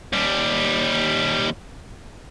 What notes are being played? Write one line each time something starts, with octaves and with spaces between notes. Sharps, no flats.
D#2 G3